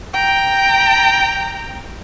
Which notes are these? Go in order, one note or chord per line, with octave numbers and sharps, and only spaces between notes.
G5 A#5